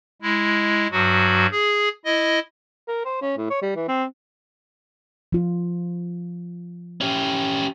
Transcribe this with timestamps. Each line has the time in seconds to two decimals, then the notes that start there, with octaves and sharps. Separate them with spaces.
0.22 G#3 E4
0.91 G2 F#3 F#4
1.52 G#4
2.05 E4 D#5
2.88 A#4
3.06 C5
3.22 C#4
3.37 A2
3.50 C#5
3.62 G3
3.76 E3
3.88 C4
5.32 F3 F4
7.01 C#4 G4